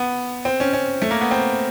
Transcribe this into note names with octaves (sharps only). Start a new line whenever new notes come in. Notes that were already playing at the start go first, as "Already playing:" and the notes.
Already playing: B3
C4
C#4
C#4
A3
A#3
B3
C4